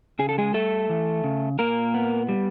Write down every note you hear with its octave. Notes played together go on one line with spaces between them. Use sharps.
C#3 G#4
A4
G#3 G#4
G3 A3 A4
E3
C#3
A#2 A#3 A#4
B3
G3